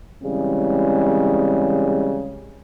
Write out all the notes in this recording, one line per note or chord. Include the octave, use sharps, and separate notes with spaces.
C#3 E3 G3 G#3 C4